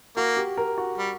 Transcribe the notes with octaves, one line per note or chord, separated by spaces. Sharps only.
A#3 F#4
G4
A#4
F#4
G3